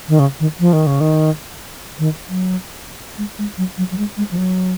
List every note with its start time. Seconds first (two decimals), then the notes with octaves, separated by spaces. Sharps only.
0.09 D#3
0.19 C#3
0.40 D#3
0.60 F3
0.73 D#3
0.87 C#3
1.01 D#3
1.99 D#3
2.29 F#3
3.18 G#3
3.38 G#3
3.58 F#3
3.78 F#3
3.91 F#3
3.98 G#3
4.17 G#3
4.31 F3
4.38 F#3